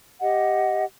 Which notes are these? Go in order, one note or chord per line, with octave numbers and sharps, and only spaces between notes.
G4 D#5 F#5